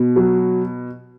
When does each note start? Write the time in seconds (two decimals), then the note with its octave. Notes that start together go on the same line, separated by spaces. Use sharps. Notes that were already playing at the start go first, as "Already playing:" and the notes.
Already playing: B2
0.16 F#3